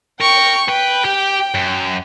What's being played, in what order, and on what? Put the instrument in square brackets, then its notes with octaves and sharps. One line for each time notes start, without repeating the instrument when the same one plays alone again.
[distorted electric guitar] A#4 [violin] G5 C#6
[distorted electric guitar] B4 [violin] G5
[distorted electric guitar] G4
F#2